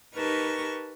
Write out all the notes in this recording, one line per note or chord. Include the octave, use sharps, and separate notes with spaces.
D#4 G4 A#4 B4 A5 C#6